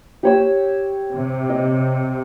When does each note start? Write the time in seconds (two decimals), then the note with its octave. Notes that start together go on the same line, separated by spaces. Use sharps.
0.23 G4 C#5 E6
1.12 C3
1.50 D#5